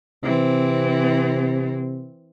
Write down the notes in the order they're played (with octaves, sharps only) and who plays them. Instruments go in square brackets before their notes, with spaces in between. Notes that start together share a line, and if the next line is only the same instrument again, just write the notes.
[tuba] C3 [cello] E3 C4